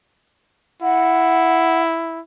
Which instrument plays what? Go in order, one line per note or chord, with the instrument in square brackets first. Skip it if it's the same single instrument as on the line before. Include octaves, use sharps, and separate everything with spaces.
[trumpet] E4 [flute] F#5